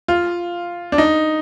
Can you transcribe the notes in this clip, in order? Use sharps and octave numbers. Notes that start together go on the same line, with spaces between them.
F4
D4
D#4